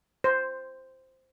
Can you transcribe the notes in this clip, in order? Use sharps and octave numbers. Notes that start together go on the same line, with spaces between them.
C5